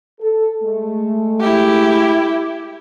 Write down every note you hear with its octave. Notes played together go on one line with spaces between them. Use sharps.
A4
G#3 A3
E4 G4